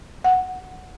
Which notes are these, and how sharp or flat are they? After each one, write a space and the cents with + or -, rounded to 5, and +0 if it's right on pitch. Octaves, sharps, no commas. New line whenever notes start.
F#5 -5